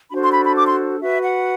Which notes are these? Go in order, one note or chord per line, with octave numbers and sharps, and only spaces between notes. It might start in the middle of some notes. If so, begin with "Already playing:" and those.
D4 F#4 A4 C5 B5
C6
B5
B5
D6
C6
F#4 B4 E5
F#5